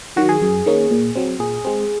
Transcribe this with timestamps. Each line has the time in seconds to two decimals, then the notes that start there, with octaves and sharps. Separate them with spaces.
0.16 D#3 F#3 F#4
0.29 G#4
0.42 F#2
0.66 D#3 A#3 C#4
0.91 A#2
1.15 F#3 C4
1.39 A#2 G#4
1.65 G#3 C4